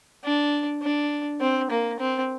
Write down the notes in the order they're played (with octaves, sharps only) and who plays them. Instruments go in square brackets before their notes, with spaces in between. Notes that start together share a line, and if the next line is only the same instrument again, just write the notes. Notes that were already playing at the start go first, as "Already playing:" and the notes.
[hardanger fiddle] D4
D4
C4
A#3
C4